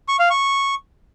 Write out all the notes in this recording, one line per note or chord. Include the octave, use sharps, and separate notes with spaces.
C#6
F5
C#6